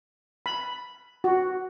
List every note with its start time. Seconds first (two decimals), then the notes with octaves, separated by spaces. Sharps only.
0.46 B5
1.24 F#4